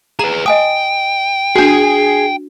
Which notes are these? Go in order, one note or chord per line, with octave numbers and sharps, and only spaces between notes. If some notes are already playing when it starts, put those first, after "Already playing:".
G#4 B4 A#5
D#5 G5 G#5 D#6
D4 F#4 G#4 G#5